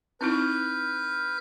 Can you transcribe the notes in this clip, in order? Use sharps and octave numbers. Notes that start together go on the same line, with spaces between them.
C4 D#4 E4 B4 F6 G6